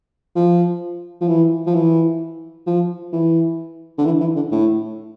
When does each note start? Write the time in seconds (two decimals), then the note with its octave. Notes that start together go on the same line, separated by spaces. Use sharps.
0.35 F3
1.21 F3
1.28 E3
1.67 F3
1.75 E3
2.66 F3
3.13 E3
3.98 D3
4.06 E3
4.21 E3
4.36 D3
4.52 A2